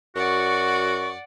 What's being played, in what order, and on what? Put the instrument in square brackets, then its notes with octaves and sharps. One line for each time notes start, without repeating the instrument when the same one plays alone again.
[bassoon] F#2 [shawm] F#4 [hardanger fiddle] D5 F#5 [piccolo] C#6